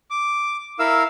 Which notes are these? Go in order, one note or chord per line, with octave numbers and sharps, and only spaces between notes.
D6
E4 A#4 F5 E6